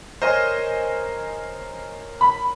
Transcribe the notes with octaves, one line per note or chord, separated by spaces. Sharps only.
A#4 C5 C#5 D#5 G#5
B5